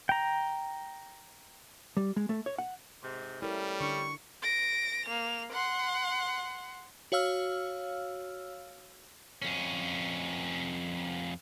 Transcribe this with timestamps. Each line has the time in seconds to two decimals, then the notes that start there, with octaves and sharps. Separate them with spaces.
0.09 G5 A#5
1.97 G3
2.16 G#3
2.29 A3
2.46 C#5
2.58 F#5
3.03 G#2 C3
3.42 G3 A3 C#4 E4 A#4
3.80 D3 D4 C#6
4.42 A#6 D7
5.06 A#3 F7
5.52 F#5 C6
7.12 F#4 C#5 F5 E6 F6
9.42 F2 C#4